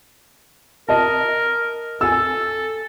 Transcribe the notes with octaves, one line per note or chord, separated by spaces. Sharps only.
A#4 D#5 A5
A4 G#5 E6